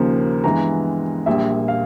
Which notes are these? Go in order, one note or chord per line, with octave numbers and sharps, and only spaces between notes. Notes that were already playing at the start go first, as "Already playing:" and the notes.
Already playing: D#2 C#3 F3 A#3
G2 E3 G#3 B3 A#5
A#1 A#2 G3 E5
F5